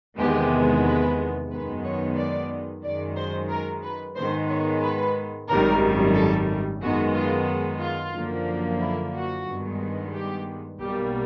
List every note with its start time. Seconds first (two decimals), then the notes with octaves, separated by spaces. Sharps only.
0.18 E2 C3 D#3 G#3 B3 G4
0.85 B4
1.51 F#2 D#3 G#3 B3 B4
1.84 C#5
2.17 D5
2.84 F#2 D#3 G#3 D5
3.17 C5
3.50 A#4
3.83 B4
4.16 G#2 D#3 G#3 B3 C5
4.49 C#5
4.82 B4
5.49 G#1 F#2 D#3 G3 A#4
6.15 A4
6.82 F#2 D#3 G#3 B3 F#4
7.15 F4
7.81 F4
8.15 F#2 D3 F3 A#3
8.81 E4
9.14 F#4
9.46 G2 D#3 G#3 B3
10.14 G4
10.79 B1 B2 G3 A#3 G4